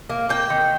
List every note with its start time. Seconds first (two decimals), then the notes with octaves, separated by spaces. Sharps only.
0.10 A#3
0.29 A#3 G5
0.50 D#3